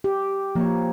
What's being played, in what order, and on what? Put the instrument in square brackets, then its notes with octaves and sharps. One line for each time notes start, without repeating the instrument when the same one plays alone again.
[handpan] G4
[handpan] F3 [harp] A#3 C#5